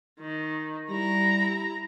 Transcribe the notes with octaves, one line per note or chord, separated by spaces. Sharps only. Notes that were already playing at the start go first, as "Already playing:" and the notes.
D#3
G3 E4 A#5